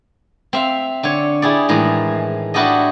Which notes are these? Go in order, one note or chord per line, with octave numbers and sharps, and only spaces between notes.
C4 E5 F5
D3 C#5
E4 G4 G#4 D5
A2 D#3 E3 G#3
D4 E4 F#4 G4 A4 D#5